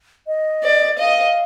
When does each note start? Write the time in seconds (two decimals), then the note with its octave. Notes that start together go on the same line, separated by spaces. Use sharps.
0.27 D#5
0.63 D5
0.99 D#5 F5